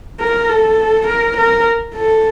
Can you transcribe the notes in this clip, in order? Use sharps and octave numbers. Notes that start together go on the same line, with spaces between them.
A#4
A4
A#4
A#4
A4